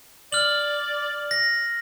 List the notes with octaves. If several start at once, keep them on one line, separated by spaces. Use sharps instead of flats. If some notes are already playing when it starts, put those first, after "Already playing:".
D5 F6 F#7
A#6